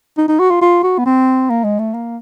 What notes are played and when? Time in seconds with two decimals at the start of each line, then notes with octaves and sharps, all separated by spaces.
0.18 D#4
0.28 D#4
0.39 F#4
0.51 F4
0.61 F4
0.83 F#4
0.98 B3
1.06 C4
1.50 A#3
1.64 G#3
1.79 A3
1.94 A#3